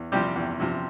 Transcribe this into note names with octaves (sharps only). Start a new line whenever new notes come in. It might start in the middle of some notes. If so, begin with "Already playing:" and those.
Already playing: E2
C3 F3 G3 G4
E2
C3 F3